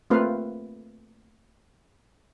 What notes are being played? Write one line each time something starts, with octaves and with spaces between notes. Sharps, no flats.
A3 A#3 C4 F4 B4 F5